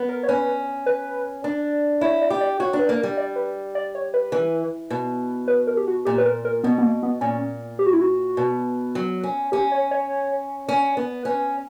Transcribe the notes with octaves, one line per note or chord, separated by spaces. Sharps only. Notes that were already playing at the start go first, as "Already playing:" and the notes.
Already playing: B3
A#4
C#5
C#4 B4
B4
D4
E4 C#5
D5
G4
D5
F#4 C#5
D4
B4
A#3
G3
D5
B4
D5
C#5
B4
E3
B2
B4
A#4
G4
F#4
A#2 G4
B4
A#4
A#4
B2 B3
B3
A#3
B3
A#2 C#4
G4
F#4
E4
F#4
B2
F#3
C#4
C#4 G4
C#5
C#5
C#4
B3
C#4 B4